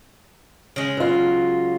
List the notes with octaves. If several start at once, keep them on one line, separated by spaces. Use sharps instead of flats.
C#3 G#3
F#3 F4